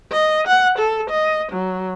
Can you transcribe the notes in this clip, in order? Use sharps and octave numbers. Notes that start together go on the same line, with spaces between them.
D#5
F#5
A4
D#5
F#3